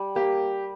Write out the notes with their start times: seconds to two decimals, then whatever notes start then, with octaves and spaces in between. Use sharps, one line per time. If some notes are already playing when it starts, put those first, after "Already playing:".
Already playing: G3
0.15 A#3 G4